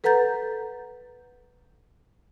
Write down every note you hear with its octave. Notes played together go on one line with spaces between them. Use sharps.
A4 B4 F#5 A#5 G6 A6